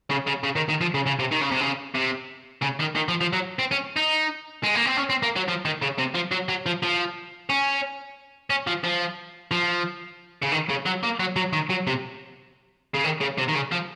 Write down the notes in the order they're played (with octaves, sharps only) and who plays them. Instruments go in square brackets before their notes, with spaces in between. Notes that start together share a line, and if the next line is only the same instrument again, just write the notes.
[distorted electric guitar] C#3
C#3
C#3
D#3
D#3
F3
C#3
C#3
C3
D#3
C#3
C3
C#3
C3
C#3
D#3
D#3
F3
F3
F#3
C4
C#4
D#4
G#3
A#3
C4
C#4
C4
A#3
F#3
F3
D#3
C#3
C3
F3
F#3
F#3
F3
F3
C#4
C#4
F3
F3
F3
C#3
D#3
C#3
F#3
A#3
F#3
F#3
D#3
F#3
C3
C#3
D#3
C#3
C3
D#3
C#3
F3